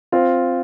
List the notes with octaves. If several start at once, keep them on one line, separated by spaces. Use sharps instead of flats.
C4 F4